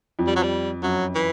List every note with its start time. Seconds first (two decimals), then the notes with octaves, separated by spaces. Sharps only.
0.19 F2
0.27 G3
0.36 F#3
0.43 G3
0.82 F#2 F#3
1.15 E3